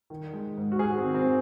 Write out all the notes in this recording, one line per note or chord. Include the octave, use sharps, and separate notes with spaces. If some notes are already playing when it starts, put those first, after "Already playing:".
D#3
G#3
G#2
F#4
G#2 G#4
C4
D#3
C4